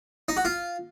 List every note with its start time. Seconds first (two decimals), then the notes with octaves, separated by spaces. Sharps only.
0.28 D#4
0.37 F#4
0.45 F4